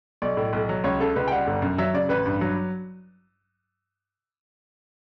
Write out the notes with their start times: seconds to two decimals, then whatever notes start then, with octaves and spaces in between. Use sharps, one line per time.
0.22 B1 D5
0.37 A2
0.53 B1
0.69 F#3
0.84 C#2 C#5
1.00 C#3 A4
1.16 C#2 B4
1.28 G5
1.31 G3 F#5
1.47 G1
1.62 F#2
1.78 F#3 E5
1.94 C#3 D5
2.09 A1 B4
2.26 G2
2.41 F#3